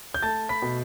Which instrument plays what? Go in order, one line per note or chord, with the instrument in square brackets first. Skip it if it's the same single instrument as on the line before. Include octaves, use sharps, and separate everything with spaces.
[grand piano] G6
A3 A5 A6
B5 B6
B2